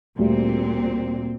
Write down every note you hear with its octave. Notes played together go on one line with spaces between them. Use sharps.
D2 A#2 G3 C4